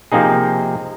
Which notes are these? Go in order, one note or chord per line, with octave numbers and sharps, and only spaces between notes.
C3 F3 A#3 C4 D#4 G#4